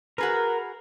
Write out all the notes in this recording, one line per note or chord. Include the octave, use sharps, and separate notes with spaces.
F#4 G#4 A#4 B4